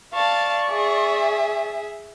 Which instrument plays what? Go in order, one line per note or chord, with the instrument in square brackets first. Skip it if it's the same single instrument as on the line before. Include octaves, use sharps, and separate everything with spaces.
[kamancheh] D5 C#6 [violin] F5 A5
[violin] G#4 E5